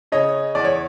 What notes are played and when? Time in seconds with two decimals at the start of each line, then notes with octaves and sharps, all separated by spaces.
0.12 C#3 C#5 D#5
0.55 E2 D5
0.64 C#5